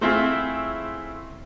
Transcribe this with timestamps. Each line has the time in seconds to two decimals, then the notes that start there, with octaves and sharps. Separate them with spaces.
0.01 A3 C4 E4 F4 G#4